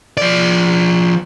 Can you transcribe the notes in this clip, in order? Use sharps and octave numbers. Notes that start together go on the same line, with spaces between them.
F3 D5